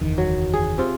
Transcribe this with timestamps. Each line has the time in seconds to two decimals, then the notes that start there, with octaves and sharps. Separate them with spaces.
0.01 F#1 E2 D#3
0.18 F#3
0.54 G#4
0.78 C3 F4